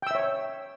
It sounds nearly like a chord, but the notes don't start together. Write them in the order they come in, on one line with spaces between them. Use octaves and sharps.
G5 E6 E5 C#5